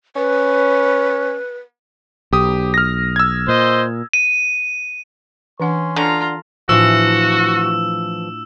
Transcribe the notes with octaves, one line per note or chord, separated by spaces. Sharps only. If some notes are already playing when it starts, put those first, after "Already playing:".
C#4 B4
B1 G4 D#6
F6 A#6
E6 G#6
A#2 C5 D#5
D#7
E3 C#4 D4 F#5 C6
D3 F4 A#5
A2 E3 F3 D4 F4 F#4 E6 E7